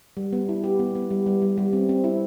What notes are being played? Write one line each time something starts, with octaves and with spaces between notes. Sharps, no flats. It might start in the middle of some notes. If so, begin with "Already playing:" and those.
G3
B3
E4
G4
B3
B3
G3
G3
G3
G3
C4
C4
E4